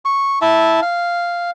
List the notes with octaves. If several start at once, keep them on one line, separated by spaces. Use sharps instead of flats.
C#6
E4 E5 A5
F5